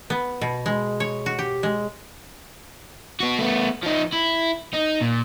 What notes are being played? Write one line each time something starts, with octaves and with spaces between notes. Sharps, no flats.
B3
B2
G#3
C#5
F#4
G4
G#3
B3 F#4
A3 B3
F3 D#4
E4
D#4
A#2